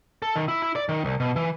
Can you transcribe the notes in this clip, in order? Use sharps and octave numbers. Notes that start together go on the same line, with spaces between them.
A4
D#3
E4
E4
D5
D#3
C2
B2
E3